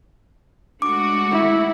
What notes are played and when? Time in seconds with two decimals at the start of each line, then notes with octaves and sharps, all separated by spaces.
0.82 G#3 A3 D4 F#4 D6
1.32 E4